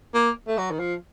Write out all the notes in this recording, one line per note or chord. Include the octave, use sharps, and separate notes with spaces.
A#3
A3
F#3
D#3
F3